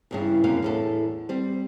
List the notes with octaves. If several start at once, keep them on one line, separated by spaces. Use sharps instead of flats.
E2 G2 C#3
F#2 C3 A#3 F5
E2 A2 A4
G3 C4